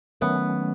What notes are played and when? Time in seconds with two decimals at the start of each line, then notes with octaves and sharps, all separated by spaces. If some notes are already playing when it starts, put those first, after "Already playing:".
0.21 D#3 F#3 A3 B3 C#4